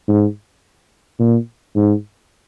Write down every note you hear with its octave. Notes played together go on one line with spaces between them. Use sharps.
G#2
A#2
G#2